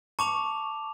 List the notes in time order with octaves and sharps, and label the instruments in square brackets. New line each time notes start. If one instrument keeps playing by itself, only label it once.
[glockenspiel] A5 D6 F7 [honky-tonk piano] C#6